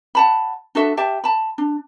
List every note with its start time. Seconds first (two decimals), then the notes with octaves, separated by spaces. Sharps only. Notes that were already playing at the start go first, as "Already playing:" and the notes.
0.15 F#5 A5 B5
0.75 D4 F#4 A4 E5
0.97 G4 E5 A5
1.24 A5 B5
1.58 D4